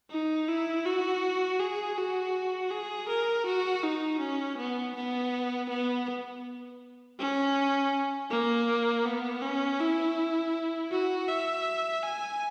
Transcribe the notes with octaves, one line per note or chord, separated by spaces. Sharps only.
D#4
E4
F#4
G#4
F#4
G#4
A#4
F#4
D#4
C#4
B3
B3
B3
C#4
A#3
B3
C#4
E4
F#4
E5
G#5